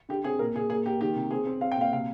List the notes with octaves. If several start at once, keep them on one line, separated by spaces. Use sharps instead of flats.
D3 G4
C4 G#4
A#2 A#4
A#2 G#4
A#3 G#4
A#3 G4
D#3 G4
C3
C4 G#4
C4
C4 F5
G5
A#2 F5
C3 F5